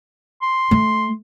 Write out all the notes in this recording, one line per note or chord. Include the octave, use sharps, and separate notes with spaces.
C6
A3